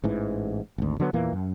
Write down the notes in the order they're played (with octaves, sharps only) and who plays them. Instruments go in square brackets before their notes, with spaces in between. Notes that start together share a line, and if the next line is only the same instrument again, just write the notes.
[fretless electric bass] A1 G#2 E3
G#1 D2
D3 F#3 B3
E2 A#2 E3 A#3
F#2